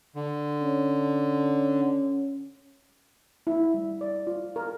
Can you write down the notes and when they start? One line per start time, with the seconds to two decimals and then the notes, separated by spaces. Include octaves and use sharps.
0.15 D3
0.61 C#4
3.47 E4
3.74 G3
4.01 D5
4.27 F4
4.56 A#4